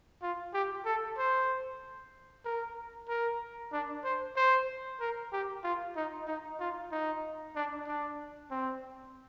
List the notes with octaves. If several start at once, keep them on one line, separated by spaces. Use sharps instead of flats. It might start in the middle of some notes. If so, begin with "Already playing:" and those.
F4
G4
A4
C5
A#4
A#4
D4
C5
C5
A#4
G4
F4
D#4
D#4
F4
D#4
D4
D4
C4